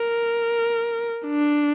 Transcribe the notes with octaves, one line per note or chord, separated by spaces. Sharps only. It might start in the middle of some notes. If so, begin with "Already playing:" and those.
Already playing: A#4
D4